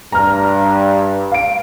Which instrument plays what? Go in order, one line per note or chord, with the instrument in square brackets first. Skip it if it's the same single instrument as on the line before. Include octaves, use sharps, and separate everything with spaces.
[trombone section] G2 [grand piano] A#5 F6
[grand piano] F5 D7